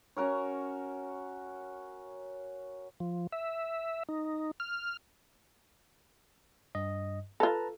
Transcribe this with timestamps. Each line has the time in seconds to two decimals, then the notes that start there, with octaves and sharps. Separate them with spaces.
0.17 C#4 F#4 A#4 C#5
3.00 F3
3.32 E5
4.09 D#4
4.60 F6
6.75 G2 D#5
7.40 F4 A4 B4 A5 A#5